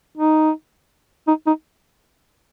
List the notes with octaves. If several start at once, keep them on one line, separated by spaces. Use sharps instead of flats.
D#4
D#4
D#4